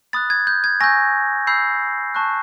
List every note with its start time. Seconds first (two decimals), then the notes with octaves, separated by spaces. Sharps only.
0.13 B5 D#6 F#6 A6
0.30 G#6
0.47 G6
0.64 G#6
0.80 G#5 C#6 E6 G6 A#6
1.47 B5 E6 G6 C7
2.15 A5 C#6 F#6